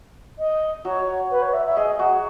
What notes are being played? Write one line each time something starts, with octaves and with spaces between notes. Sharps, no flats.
D#5
F#3 F#4 C#5
B4
C#5
E5
E5
G#3 G#4 D#5
F#3 F#4